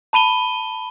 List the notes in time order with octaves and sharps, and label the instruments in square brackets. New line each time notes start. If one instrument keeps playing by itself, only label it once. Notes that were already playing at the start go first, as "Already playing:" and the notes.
[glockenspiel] A5 B5 D#7 G7